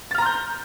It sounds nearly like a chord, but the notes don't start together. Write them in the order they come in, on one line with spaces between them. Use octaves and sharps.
A6 F6 A#5 C6 G6